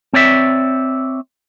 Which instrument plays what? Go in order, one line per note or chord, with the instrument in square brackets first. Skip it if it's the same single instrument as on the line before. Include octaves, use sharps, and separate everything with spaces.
[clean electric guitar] C4 C#5 D5 E5